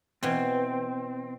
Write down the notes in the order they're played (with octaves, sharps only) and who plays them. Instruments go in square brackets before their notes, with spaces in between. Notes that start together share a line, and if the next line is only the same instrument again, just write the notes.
[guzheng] B2 E3 [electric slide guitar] C4